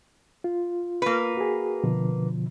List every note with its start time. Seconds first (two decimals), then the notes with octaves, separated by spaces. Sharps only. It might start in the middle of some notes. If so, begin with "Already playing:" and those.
0.44 F4
1.02 A#3 B4
1.37 F#4 G#4
1.84 B2 D3 F3